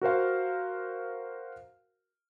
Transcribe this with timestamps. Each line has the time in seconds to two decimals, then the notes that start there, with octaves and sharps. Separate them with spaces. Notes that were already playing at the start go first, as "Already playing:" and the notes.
0.01 F#4 A#4 C5 F5